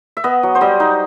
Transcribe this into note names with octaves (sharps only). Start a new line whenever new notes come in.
E5
B3 D#5
F#3
C5
G3 D#5
D#4